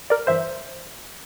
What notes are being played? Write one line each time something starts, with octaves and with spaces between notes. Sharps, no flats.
A#4 D5
G1 G2 E3 C5 E5